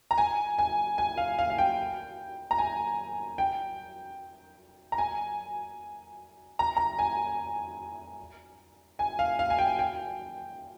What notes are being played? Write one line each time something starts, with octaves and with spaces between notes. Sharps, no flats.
A#5
G#5
G#5
G#5
F5
F5
F5
G5
A#5
G#5
G5
A#5
G#5
A#5
A#5
G#5
G#5
F5
F5
G#5
G5
G5